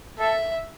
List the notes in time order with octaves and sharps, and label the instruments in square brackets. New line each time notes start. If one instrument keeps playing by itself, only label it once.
[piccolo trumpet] A4 [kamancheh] E5